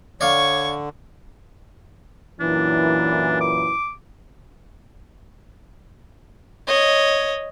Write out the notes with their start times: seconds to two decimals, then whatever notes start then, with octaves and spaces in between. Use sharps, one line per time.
0.21 D3 C#5 D5 F5 C#6
2.40 F#2 A#2 E3 D4
3.41 D6
6.67 C#5 D#5